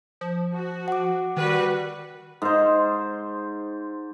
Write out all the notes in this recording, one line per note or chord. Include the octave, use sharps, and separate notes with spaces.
F3
F#4
F#5 D6
D#3 G3 F#4 B4
G#2 C5